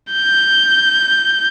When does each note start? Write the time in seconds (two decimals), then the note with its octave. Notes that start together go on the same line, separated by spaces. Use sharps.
0.12 G6